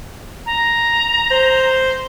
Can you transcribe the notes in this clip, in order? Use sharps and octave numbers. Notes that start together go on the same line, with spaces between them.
A#5
C5